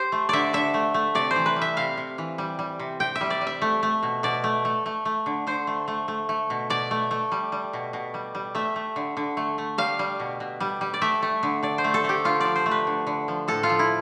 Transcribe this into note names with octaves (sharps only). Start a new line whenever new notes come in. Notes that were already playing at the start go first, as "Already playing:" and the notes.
Already playing: G4 C5
A3
D3 D5 E5
D3 E5
A3
A3
C3 D5
C5
E3
B4
G3
E5
C3 F5
C3
E3
G3
G3
C3
C3 G5
E5
G3
D5
G3
E5
A3
A3
B2
B2 D5
A3
A3
A3
A3
D3
D3 C5
A3
A3
A3
A3
B2
B2 D5
A3
A3
G3
G3
B2
B2
G3
G3
A3 E5
A3
D3
D3
A3
A3
G3 F5
G3
B2
B2
G3
G3
D5
A3 E5
A3
D3
D3 D5
C5
A3
A4
A3 G4
D3 F4
F3 D5
C5
A3
B4
D3
D3
F3
A2 A4
F4
F3
E4